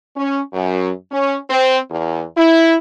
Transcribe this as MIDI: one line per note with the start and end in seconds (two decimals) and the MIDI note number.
0.17 0.40 61
0.53 0.90 42
1.11 1.37 61
1.50 1.78 60
1.91 2.23 40
2.37 2.76 64